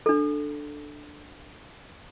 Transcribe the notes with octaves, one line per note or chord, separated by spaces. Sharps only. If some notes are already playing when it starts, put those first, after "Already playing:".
D4 A4